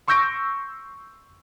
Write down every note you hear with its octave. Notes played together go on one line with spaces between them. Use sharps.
C6 C#6 E6 G6 A#6 D7